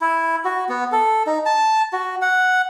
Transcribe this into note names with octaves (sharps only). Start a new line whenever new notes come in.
E4
F#4
B3
A4
D#4
A5
F#4
F#5